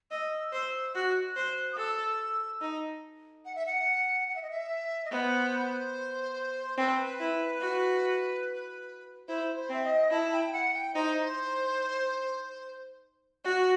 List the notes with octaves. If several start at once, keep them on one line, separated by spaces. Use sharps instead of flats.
D#5 E6
C5
F#4 F#6
C5
D#6
A4 E6
D#4
F#5
E5
F#5
F#5
E5
D#5
E5
D#5
B3 C5
C4 B4
E4
F#4
E4 C5
C5
C4 E5
D#5
E4 A5
G5
F#5
G5
D#4 C5
F#4